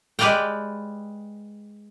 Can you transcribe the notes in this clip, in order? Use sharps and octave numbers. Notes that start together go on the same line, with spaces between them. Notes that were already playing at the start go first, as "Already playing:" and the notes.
G#3 G4 B4 D5 F5 G5